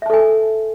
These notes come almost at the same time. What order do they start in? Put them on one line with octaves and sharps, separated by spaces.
E5 A5 A4 G#5